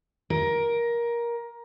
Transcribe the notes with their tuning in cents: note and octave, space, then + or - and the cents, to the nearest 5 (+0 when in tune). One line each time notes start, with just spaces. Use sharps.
A#4 +15